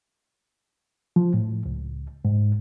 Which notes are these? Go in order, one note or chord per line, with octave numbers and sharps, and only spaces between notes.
F3
A2
C#2
G#2